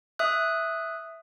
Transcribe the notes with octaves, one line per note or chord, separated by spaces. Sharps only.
E5 D#6 F#6